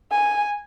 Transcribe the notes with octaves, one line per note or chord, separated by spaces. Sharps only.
G#5